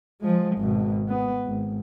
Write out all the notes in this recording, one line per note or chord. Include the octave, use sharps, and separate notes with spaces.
F3 G#3
G#1 B2
B3
G#1